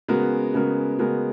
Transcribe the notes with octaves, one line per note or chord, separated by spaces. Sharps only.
C#3 G#3 B3 F#4 A#4
C#3 G#3 B3 F#4 A#4
C#3 G#3 B3 F#4 A#4